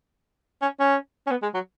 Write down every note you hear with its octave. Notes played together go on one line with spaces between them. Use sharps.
C#4
C#4
C#4
B3
G#3
F#3